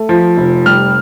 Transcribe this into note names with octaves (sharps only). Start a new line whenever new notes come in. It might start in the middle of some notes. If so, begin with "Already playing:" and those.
Already playing: A3
F3
F1
G3 F6